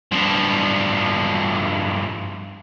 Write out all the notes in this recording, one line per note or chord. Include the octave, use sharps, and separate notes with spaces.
G2 F3